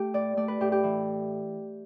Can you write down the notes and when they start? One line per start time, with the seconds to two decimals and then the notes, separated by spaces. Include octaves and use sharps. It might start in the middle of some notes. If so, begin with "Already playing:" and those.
Already playing: A3 G4
0.14 A2 D5
0.37 A3 D5
0.48 B4
0.60 A2 G4
0.72 G4
0.83 E3